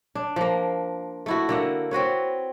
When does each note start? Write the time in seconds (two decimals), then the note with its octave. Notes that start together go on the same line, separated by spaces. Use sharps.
0.15 D4
0.36 F3 A#3
1.26 A3 E4 F#4
1.49 D3 A#3 F#5
1.91 C4 F#4 B4 C#5